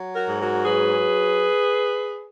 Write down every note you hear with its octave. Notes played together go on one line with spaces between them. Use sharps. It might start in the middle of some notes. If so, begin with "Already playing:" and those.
Already playing: F#3
F#4 A#4
G#2
F#4 A#4
F#3 G#4 B4